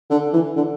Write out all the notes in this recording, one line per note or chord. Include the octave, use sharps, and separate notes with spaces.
D3
E3
D3